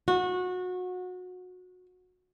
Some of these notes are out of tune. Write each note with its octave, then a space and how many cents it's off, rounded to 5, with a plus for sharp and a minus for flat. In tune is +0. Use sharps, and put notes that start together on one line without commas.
F#4 -25